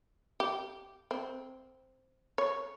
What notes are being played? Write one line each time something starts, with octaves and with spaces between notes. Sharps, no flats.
G4
C4
C#5